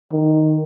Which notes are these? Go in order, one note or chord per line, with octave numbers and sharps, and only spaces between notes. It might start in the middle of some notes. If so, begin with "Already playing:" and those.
D#3